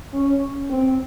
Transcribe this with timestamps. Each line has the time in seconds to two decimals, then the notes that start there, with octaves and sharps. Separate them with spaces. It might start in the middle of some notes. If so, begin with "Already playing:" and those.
0.14 C#4
0.70 C4